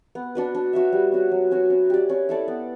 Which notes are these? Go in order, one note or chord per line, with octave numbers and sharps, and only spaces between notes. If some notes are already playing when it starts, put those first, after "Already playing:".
B3
D4 F#4 B4
D4
F#4 C#5 E5
G3
C#4 F#4
F#3
C#4 F#4
C#4
G4 D5
C#4
E4 A4 D5
B3